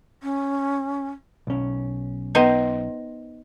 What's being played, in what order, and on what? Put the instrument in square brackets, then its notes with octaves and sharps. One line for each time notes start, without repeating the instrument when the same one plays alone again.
[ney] C#4
[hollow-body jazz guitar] B1 C#4
[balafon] B3 B4 [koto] D#4 C5